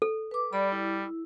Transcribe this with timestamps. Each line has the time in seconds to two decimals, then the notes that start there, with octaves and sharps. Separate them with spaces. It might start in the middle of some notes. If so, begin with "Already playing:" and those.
0.02 A4
0.31 B4 D6
0.53 G3 D5 B5
0.72 E4